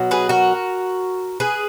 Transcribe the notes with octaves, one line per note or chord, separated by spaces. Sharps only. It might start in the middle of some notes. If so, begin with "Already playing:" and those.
Already playing: B2 F#3
G#4 B4
F#4 A#4
G#4 B4